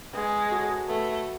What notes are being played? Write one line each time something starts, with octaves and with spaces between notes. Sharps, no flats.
G#3 B3
F#4 A4 C#5
A3 B3